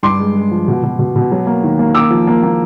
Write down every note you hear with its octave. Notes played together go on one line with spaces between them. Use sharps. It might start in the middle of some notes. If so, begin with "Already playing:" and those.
G2 C6 D6
G#3
G#3
F3
B2
B2
B2
B2
F#3
A#3
D#3
A#3
A#3 D6 E6
F3
A#3
A#3